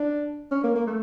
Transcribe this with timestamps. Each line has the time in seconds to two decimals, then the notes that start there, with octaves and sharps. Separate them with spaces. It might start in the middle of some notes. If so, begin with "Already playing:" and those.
Already playing: D4
0.51 C#4
0.63 A#3
0.75 A#3
0.87 A3